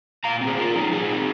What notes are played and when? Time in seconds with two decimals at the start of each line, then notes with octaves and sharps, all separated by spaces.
0.24 A#2 F5 A#5
0.41 C4
0.47 G#4 C5
0.57 A#2 F4 A#4
0.74 F3 D#4 G#4
0.92 A#2 D#4 G#4
1.09 C4